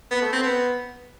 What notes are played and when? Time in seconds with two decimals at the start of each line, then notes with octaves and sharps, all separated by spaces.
0.11 B3
0.22 A3
0.32 C4
0.43 B3